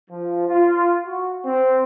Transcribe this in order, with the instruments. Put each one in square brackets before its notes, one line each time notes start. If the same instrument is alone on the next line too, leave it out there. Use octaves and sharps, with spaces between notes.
[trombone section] F3
F4
F#4
C4